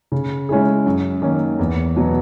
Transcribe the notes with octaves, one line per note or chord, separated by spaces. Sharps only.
C#3
G#3 C#4 E4 G#4
F#2
D#3 A#3 C#4
E2
B2 F#3 B3